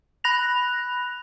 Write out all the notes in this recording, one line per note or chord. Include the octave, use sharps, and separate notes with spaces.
B5 F#6 A#6 F7